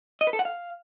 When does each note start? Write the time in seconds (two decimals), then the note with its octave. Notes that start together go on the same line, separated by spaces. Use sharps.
0.21 D#5
0.27 B4
0.33 A4
0.39 F#5
0.45 F5